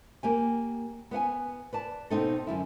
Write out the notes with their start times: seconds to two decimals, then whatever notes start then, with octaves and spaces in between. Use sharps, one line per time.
0.23 A#3 G4 G#5
1.11 B3 B4 F#5 G#5
1.73 B4 D5 A5
2.10 B2 B3 C4 D#4 A4
2.47 F#2 D3 E4